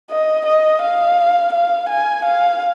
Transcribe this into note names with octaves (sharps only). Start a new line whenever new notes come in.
D#5
D#5
F5
F5
G#5
F5